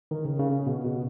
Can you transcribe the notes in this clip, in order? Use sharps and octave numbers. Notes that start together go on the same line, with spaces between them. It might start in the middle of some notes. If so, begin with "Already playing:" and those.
D#3
C#3
C#3
C#3
B2
B2